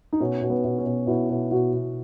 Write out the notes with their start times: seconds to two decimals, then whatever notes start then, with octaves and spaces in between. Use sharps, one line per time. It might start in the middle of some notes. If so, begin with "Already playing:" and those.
0.13 D#4
0.20 B2 C#4
0.42 B2
0.50 B3
0.64 B2
0.78 C#4
0.85 B2
1.07 B2 E4
1.30 B2
1.51 B2 F#4
1.73 B2